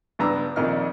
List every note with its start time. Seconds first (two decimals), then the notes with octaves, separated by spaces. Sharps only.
0.19 C#2 G2 B3 D4 A#5 E6
0.56 A#1 F2 D#3 F3 D#4 F6